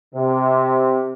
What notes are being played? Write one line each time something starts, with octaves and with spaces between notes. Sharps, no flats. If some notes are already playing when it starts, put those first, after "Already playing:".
C3